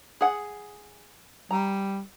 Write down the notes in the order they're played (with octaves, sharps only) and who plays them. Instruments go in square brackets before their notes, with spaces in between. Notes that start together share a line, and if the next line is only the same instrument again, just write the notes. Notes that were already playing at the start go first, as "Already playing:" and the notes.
[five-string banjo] G#4 F#5
[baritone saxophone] G3 [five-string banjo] A#5